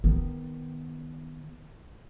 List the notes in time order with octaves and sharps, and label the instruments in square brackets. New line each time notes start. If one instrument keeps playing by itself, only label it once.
[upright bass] D#3 B3